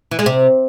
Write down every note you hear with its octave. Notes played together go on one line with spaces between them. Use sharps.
E3
G#3
C3